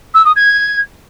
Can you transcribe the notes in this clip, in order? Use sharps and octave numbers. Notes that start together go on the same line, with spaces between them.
E6
D#6
G#6